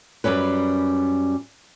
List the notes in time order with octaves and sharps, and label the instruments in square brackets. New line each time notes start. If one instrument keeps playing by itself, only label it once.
[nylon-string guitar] F#2 G3 C#4 B4